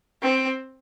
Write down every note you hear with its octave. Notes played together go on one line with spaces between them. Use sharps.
C4